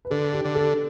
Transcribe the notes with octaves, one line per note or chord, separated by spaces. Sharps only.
B4
D3 A4
G4
D3
A4